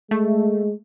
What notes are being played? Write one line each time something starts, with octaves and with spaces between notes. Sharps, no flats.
G#3 A3